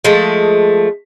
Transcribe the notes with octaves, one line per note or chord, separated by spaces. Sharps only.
F3 G#3 A3